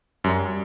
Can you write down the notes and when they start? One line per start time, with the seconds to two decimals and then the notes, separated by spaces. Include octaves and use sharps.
0.24 F#2 G3